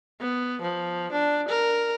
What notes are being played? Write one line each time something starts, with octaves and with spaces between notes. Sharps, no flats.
B3
F3
D4
A#4